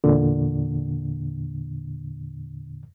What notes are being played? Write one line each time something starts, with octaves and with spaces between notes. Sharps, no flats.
E2 A#2 D3